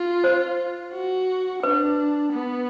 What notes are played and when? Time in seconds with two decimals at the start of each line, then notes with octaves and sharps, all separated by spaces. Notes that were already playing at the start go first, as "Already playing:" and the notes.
Already playing: F4
0.24 C5
0.93 F#4
1.63 D4 B4
2.33 B3